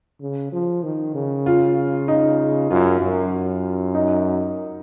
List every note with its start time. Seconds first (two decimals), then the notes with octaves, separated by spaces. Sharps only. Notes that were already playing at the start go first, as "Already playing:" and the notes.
0.21 C#3
0.52 F3
0.83 D#3
1.15 C#3
1.46 F4
2.08 D#4
2.70 F#2 F4
3.01 F#2
3.95 D#4